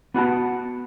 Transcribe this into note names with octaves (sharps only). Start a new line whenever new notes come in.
B3 F#4 F#5 A5